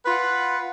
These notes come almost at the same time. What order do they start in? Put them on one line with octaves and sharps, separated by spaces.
B4 F4 F#5